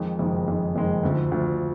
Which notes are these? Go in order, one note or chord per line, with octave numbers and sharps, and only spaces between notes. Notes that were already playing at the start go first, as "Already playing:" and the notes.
Already playing: F2 D#3 G#3
F#1 F2 D#3 G#3
F#1 F2 D#3 G#3
F#1 F2 D#3 G#3
D2 D3 F3
D2 D3 F3